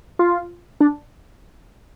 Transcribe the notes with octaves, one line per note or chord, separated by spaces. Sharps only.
F4
D4